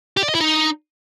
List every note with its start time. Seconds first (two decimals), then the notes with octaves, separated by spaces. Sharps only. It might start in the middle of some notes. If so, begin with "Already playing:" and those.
0.17 G4
0.23 D5
0.29 D#5
0.35 E4
0.41 D#4